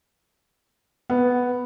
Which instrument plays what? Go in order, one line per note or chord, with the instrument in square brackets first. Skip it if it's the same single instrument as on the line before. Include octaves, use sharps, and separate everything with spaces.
[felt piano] B3